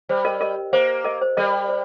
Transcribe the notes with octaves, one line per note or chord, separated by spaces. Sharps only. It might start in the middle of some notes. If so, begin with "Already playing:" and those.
G3 C5
A#4 D#5
A#4 D#5
A#3 C5
A#4 D#5
C5
G3 A#4 D#5
C5